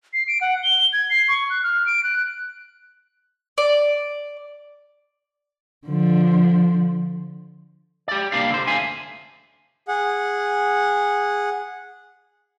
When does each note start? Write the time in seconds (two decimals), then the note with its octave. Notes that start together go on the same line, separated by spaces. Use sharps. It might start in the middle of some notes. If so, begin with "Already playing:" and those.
0.13 C7
0.28 D7
0.41 F#5
0.63 G7
0.93 G#6
1.10 C7
1.28 C#6
1.50 F#6
1.63 F6
1.86 D7
2.03 F#6
3.58 D5
5.87 D3 F3
8.08 G4 D5
8.32 C2 G3 A#3 D4 D5 F5
8.50 D3 C5
8.67 D2 D3 E5 F5 G#5
9.88 G#4 F#5